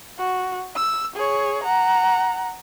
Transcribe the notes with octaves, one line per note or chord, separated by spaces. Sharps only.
F#4
E6
G#4 C#5
F#5 A#5